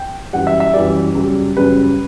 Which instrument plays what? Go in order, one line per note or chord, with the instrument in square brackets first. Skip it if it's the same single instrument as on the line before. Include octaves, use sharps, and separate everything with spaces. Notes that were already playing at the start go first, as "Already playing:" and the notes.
Already playing: [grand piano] G5
F#2 E3 G3 F#5
E5
E5
F#2 E3 G3 D5
F#2 C#3 G3
F#2 C#3 G3 B4